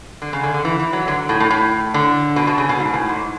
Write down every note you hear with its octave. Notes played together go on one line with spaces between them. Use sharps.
D3
C#3
D3
D3
E3
E3
F#3
D3
A2
A2
A2
D3
B2
B2
C#3
B2
G#2
A2
G#2